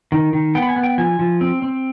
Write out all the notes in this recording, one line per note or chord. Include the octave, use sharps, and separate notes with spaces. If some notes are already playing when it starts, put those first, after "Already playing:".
D#3
D#3
B3 G5
B5
G#5
B3
G5
F3 G#5
F3
C4
C4